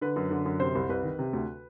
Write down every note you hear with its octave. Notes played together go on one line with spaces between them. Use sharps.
D3 B4
F#2
D3
F#2
C3 C5
C2
C2 B4
D#3
C3
D2